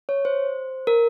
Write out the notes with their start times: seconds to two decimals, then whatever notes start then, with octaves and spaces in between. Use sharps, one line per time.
0.09 C#5
0.25 C5
0.87 A#4